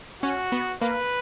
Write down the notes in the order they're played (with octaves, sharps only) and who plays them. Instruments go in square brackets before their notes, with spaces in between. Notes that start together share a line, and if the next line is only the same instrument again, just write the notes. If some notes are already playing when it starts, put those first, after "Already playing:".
[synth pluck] C#4 [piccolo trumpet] F#4
[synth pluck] B3
[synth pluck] A#3 [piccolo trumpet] B4